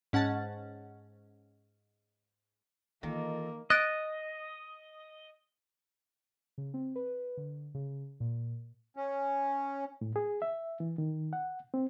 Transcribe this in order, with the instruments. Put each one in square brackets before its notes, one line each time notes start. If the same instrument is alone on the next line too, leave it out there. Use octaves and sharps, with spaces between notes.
[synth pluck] G#2 C#4 F#5 A5 A6
[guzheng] D#3 [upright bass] E3 [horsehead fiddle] A#3 [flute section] F4 A4 D#5
[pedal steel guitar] D#5 [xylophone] F#6 A6 D7
[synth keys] C#3
C4
B4
D3
C#3
A#2
[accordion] C#4
[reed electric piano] A2
G#4
E5
E3
D#3
F#5
C4